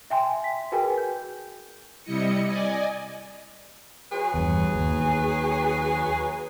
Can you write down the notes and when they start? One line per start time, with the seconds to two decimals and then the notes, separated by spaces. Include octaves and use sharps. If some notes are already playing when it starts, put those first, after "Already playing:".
0.10 E5 G5 G#5 C6
0.44 B6
0.72 F#4 G#4 A#4 B4 G5 G#5
0.98 G6
2.03 C3 G3 E4 D#5 C#7
2.47 D5 D#5 G#5
4.12 F#3 G#4 B4
4.34 E2 G2
4.74 D#2